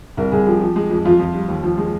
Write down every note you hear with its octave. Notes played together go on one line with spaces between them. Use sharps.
C2 A#4
C2 G#4
F3 G4
F3
G#3
F2
F2 F4
F2
G3
D#2
F3
G#3